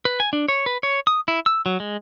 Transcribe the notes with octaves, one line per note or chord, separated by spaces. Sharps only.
B4
G#5
D4
C#5
B4
C#5
D#6
E4
E6
F#3
G#3